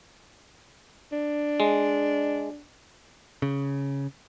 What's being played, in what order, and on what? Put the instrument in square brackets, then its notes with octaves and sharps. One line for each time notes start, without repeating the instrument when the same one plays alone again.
[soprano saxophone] D4
[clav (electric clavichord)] G#3
[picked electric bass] C#3